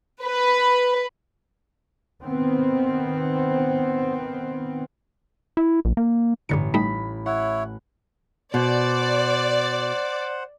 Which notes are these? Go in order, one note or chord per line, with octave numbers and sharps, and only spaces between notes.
B4
D#3 B3 C4
E4
A#1
A#3
A1 G2 D3 C#7
G3 A3 D#4 B5
E4 C#5 F#5
B2 C5 D5 F#5